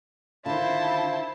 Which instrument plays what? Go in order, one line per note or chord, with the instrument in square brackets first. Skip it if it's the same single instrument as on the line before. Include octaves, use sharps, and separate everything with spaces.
[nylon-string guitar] D3 D#3 [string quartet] E4 [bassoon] F4 [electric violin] C5 A5